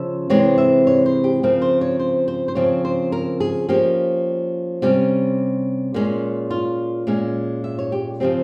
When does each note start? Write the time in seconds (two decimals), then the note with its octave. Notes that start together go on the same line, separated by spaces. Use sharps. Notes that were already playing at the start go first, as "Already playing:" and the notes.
Already playing: C#3 F3 C#4 E5
0.30 C3 E3 G#3 C4 C#5
0.58 E5
0.87 C#5
1.06 C5
1.24 G4
1.43 C#3 F3 C4 A#4
1.62 C5
1.81 C#5
1.99 C5
2.28 C5
2.48 C5
2.55 C#3 F3 C4 C#5
2.85 C5
3.12 A#4
3.40 G#4
3.69 F3 A#3 C#4 G4
4.82 C3 G3 C#4
5.94 A#2 G#3 C#4
6.51 F4
7.07 A#2 G#3 C#4
7.64 E5
7.79 C#5
7.92 G4
8.20 C#3 F3 C4 G4